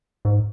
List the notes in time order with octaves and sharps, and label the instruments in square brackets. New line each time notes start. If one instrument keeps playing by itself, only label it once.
[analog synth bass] G#2